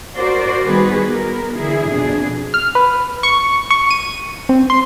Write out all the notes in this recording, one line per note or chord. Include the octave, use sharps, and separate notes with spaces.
F#4 A#4 C5 D5
D#3 G3 B3 F#4 G#4 B4
B3 A#4
D3 E3 E4 G#4
F2 B2 D4 G#4
F6
B4
C#6
C#6
D#7
C4
C6